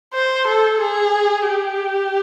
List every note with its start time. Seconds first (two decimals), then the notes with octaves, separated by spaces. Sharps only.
0.14 C5
0.48 A4
0.81 G#4
1.49 G4